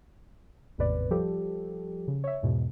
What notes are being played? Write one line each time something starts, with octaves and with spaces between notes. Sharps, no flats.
G#1 E2 A2 C3 B4 D5
F3 G3 G4 A4
C#3
C#5 E5
E2 G#2 B2